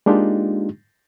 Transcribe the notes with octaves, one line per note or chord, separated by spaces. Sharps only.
G#3 A#3 D4 D#4 F4 G4